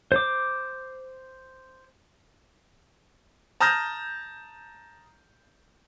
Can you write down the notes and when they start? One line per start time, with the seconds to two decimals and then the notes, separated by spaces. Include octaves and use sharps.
0.12 C5 D6
3.60 A5 A#5 D#6 F6 G6 A#6